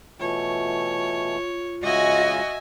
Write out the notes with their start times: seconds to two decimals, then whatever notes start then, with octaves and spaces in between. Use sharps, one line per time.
0.20 B2 E3 A3 F4 C#5
1.83 C#3 G#3 F#4 D#5 E5 G#5